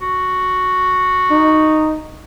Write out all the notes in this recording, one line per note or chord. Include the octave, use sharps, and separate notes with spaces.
F#4
D#4